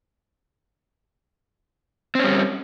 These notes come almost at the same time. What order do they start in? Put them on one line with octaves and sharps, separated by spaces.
C4 C#4 G3